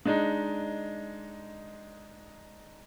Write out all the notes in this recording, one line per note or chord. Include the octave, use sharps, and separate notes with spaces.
G#3 D4 D#4